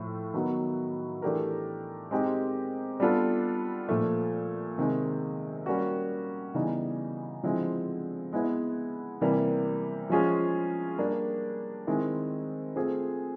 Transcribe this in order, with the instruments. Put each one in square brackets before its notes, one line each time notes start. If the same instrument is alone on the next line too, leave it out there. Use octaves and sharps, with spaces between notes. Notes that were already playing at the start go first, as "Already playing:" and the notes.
Already playing: [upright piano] A2 F3 A3 F4
D#3 F#3 B3 D#4
E3 A3 D4 G4 A#4
G#3 C4 D#4 G4
G3 B3 D4 F4 A4
A#2 F3 A3
C3 D#3 G#3
G3 A#3 C#4 F#4
C#3 E3 G3 B3 D#4
D3 F3 G#3 C4 E4
G#3 B3 E4
C3 E3 G3 A#3
F3 G#3 C#4 F4 G#4
G3 A#3 D4
D#3 G#3 C4 E4
A3 C4 F4 G#4